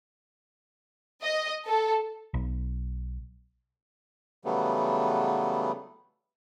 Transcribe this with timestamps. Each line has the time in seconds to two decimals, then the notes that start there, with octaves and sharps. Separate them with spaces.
1.22 D#5
1.67 A4
2.34 B1
4.45 C#3 E3 F#3 G3 A3 B3